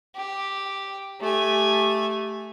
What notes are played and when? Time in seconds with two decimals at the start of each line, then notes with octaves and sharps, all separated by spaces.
0.15 G4
1.21 A3 G4 G#5